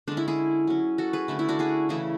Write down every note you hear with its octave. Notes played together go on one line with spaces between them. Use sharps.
D3 G#3 C#4 D4
E4
E4 G#4
F#3 C#4
F#4 A4
G#4 B4
D3 A3 C#4 E4
E4
D4 F#4
E4 G#4
C#3 E3 A3 E4 G#4